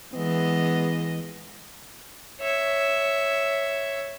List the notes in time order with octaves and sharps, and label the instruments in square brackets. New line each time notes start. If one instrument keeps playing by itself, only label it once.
[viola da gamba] E3 G#3 D#5 [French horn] B3
[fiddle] C#5 E5